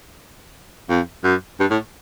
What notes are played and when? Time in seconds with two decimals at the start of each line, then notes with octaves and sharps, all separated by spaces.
0.90 F2
1.24 F#2
1.60 G2
1.70 A2